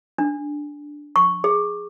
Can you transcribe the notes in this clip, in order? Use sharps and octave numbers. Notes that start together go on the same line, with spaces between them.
D4
C#6
G#4